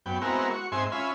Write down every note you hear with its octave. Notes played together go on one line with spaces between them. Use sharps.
F#2 B3 G5
G#3 B3 C4 E4 F#4 A#4
F#4 C#6
G#2 C4 E5 G#5 C6
C#4 F4 E5 G#5 B5